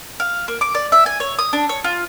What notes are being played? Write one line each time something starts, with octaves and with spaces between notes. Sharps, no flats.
F5
A#3
D6
D5
E5
G#5
C#5
D#6
D4
C#5
F4